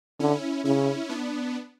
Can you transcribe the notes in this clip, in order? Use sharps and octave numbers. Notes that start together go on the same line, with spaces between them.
D3 C#4 E4
C#3 C#4 E4
B3 D4